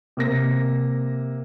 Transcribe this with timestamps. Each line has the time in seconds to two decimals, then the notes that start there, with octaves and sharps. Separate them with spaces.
0.17 C3 A#3 A#6